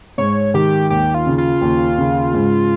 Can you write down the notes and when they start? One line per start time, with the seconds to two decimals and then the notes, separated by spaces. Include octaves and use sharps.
0.18 G#2 C#5
0.54 D#3 G4
0.90 D#2 G4
1.14 F4
1.26 C#3
1.38 F4
1.61 D#2
1.98 C#3
2.34 G#2